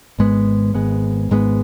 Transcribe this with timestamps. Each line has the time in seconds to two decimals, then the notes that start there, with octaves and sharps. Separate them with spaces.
0.19 G#1 G#2 G#3 B3
0.74 G#1 G#2 G#3 B3
1.29 G#1 G#2 G#3 B3